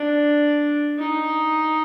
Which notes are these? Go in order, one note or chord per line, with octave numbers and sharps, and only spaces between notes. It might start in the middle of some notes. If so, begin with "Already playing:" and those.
Already playing: D4
D#4